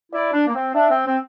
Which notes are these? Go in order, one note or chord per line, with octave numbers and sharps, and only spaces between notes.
E4 D5
D4
A#3
C4
D4 E5
C4
C4